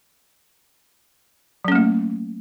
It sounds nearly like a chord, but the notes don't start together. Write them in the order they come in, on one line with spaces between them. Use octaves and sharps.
F#3 C#4 A#3 A3